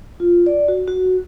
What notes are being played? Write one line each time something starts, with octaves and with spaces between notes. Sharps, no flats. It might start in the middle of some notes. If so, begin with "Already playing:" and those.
F4
D5
F#4
F#4